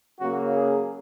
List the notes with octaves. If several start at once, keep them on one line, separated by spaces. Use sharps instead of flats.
C#3 F#3 A#3 F#4
G#4